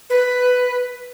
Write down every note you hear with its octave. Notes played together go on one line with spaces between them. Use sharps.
B4